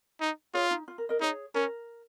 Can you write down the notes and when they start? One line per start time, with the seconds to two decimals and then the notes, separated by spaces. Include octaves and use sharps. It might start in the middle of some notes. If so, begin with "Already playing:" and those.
0.21 D#4
0.54 F4 G#4 C#5
0.71 D#4
0.88 F4
0.98 A#4
1.09 A#4 D#5
1.20 D#4 G#4 C#5
1.54 C#4 A#4